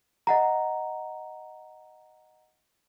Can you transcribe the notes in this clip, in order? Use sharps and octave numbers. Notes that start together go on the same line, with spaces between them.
D#5 F#5 A#5